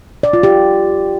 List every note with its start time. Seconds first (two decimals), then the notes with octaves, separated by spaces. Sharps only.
0.23 D5
0.33 F4
0.43 G4